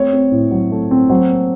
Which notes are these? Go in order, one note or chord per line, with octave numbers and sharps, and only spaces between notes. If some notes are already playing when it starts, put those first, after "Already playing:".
Already playing: A3 C4 C#5
C4
A2
F#3
A3
C4
F#3 C5
A#3